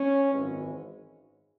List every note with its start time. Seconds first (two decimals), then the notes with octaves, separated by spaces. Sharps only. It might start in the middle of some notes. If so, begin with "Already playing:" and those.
Already playing: C#4
0.32 G#1 F#2 E3 G#3